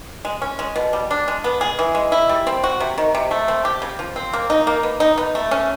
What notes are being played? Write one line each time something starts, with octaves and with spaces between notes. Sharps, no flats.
G#3
C#4
G#3
B2
G3
D4
G#3
B3
G#4
E3
G#3
E4
G3
C4
F#4
C3
D#3
C3
A3
C4
G4
C#3
F3
C4
A#3
D#4
A#3
B3
D#4
B3
A3
C#4